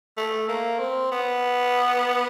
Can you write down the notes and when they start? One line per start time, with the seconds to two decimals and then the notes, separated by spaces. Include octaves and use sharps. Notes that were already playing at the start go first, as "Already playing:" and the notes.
0.17 A3
0.48 A#3
0.79 C4
1.12 B3